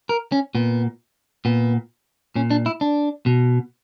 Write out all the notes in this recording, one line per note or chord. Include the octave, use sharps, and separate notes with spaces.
A#4
C#4
A#2 B3
A#2 B3
A#2 C#4
D4
E4
D4
B2